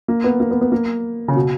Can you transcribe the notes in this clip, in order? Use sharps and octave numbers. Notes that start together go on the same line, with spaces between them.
A#3
B3
A#3
B3
B3
A#3
C#3
B2